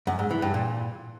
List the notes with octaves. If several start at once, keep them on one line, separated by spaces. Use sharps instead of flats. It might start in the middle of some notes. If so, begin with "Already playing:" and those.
F#2
G#2
E3
G2
A#2